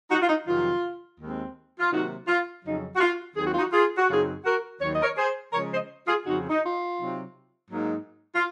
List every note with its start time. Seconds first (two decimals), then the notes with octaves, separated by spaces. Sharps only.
0.11 D#4 F#4
0.22 F4
0.29 D#4
0.47 F2 C3 D#3 F#3 F4
1.19 D#2 D#3 G#3 C4
1.79 F4
1.92 C3 D#3 F#3 A#3 D#4 F#4
2.28 F4
2.64 F2 C#3 F#3 D#4
2.96 F#4
3.01 F4
3.36 D#2 D#3 F#3 C4 G#4
3.44 F#4
3.51 F4
3.59 D#4 F#4
3.73 F4 G#4
3.98 F#4
4.09 F#2 C#3 F#3 C4 D#4 F4 G#4
4.45 F#4 A#4
4.81 D#2 D#3 F#3 C#5
4.92 D#5
5.03 A#4 C#5
5.18 G#4 C5
5.53 C#3 F3 G#3 A#4 C#5
5.72 C5 D#5
6.07 F4 G#4
6.26 F2 C#3 F3 C4 D#4 F#4
6.50 D#4
6.62 F4
6.98 C3 F#3 C4 D#4
7.70 G#2 F#3 A#3 D#4
8.35 F4